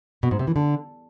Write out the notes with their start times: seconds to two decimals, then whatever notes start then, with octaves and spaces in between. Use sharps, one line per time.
0.23 B2
0.31 G#2
0.39 C3
0.48 E3
0.56 D3